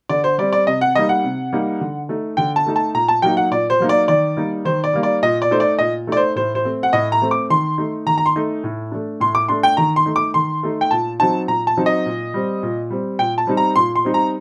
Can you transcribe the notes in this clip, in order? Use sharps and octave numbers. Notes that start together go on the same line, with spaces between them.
D3 D5
C5
G3 C4 D5
D5
C3 D#5
F#5
G3 A#3 D#4 D#5
F#5
C3
G3 A#3 D#4
D3
A3 D#4
D3 G5
A5
A3 D#4
A5
A#2 A#5
A5
F#3 A#3 D#4 G5
F#5
A#2 D5
C5
F#3 A#3 D#4
D5
D#3 D5
G3 A#3 D#4
D#3 C5
D5
G3 A#3 D#4
D5
A#2 D#5
D5
A3 D#4 C5
D5
A#2 D#5
A3 D#4 D5
C5
A2 C5
C5
A3 C4
F#5
A2 D#5
A#5
A3 C4
D6
D#3 C6
A3 D#4
D#3 A#5
A#5
C6
A3 D#4
A2
A3 D4
A2 C6
D6
A3 D4 C6
G5
D#3 A#5
C6
A3 D#4
D6
D#3 C6
A3 D#4
G5
A#2 A5
F#3 C4 D#4 A5
A#2 A#5
A5
F#3 C4 D#4
D#5
A#2
G3 C4
A#2
G3 C4
A#2 G5
A5
G3 C4 D#4
A#5
A#2 C6
C6
G3 C4 D#4
A#5